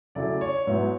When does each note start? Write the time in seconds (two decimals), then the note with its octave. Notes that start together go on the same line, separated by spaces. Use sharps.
0.15 C#3 F#3 A3 E4 D5
0.41 C#5
0.66 G#2 F#3 B3 E4 C#5